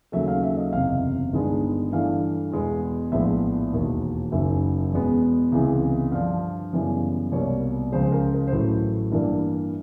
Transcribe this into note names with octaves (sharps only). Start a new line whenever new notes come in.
D#2 C#3 F#3 A3 E5
F5
E5
D#5
F#1 E2 C3 F5
G1 G2 D#3 G#3 B3
G2 E3 A3 F5
E2 B2 G#3 B3
A#1 A2 F3 G#3 B3 E5
E1 D#2 D#3
F#1 F#2 D#3 E5
E2 B2 G#3 B3
C#2 C3 E3 G#3 B3
G2 D3 F3 F5
F#2 C#3 E3 G3 B3
C2 B2 G3 A#3 C#5
C#2 C#3 F3 G#3 C5
A#4
A#4
C5
A1 A2 F#3 A3 B4
G2 E3 G3 A#3 A#4